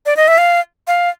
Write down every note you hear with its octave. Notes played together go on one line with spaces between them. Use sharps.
D5
D#5
E5
F5
F5